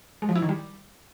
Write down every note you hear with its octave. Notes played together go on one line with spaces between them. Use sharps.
G#3
F3
E4
D#3
G3